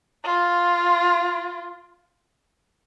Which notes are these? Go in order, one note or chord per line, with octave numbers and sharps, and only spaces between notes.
F4